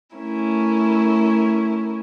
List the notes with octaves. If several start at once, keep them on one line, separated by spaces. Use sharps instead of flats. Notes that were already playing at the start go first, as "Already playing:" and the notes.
A3 C#4 E4 A#4